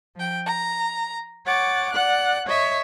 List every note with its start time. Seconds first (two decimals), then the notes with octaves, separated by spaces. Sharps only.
0.15 F3 G5
0.46 A#5
1.46 C#5 F#5 D6 A6
1.92 D5 F#5 F#6
2.47 C#5 D#5 E5